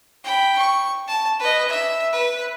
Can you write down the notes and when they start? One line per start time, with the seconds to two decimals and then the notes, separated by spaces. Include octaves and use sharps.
0.24 G5 B5
0.58 C#6
1.07 A5
1.40 B4 D#5
1.68 E5
2.12 B4